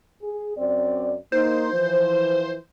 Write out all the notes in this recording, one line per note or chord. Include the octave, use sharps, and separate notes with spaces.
G#4
F#2 C4 D5
A#3 D#4 C5
E3 F3